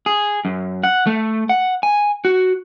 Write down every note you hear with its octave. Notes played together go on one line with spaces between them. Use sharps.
G#4
F#2
F#5
A3
F#5
G#5
F#4